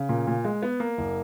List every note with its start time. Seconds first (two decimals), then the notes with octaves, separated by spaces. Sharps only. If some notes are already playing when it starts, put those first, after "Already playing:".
Already playing: C#3
0.09 A#2
0.27 A#2
0.45 G#3
0.63 B3
0.80 A#3
0.97 F#1